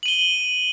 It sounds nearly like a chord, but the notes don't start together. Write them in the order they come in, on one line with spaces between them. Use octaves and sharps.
F#7 D#7 G7